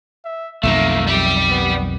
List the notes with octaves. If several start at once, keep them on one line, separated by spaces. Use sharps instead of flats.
E5
B1 F2 D#3 A3 A#3 E5
G3 G4 E5
B3